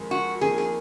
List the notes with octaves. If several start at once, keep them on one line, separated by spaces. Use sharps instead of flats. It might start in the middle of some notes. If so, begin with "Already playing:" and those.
Already playing: F2 D#3 G#3
F#4
F2 D#3 A#3 G#4
G#4